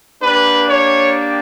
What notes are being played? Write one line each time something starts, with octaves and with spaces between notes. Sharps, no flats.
A#3 D4 G4 B4
C#5